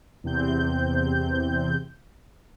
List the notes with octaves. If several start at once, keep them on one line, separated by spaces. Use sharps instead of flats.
E2 C3 C4 G6